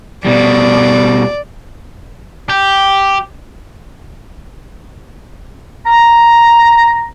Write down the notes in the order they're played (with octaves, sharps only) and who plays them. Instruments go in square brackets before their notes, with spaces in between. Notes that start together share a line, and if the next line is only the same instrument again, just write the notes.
[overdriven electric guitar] B2 G3 [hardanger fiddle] D5
[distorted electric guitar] G4
[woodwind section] A#5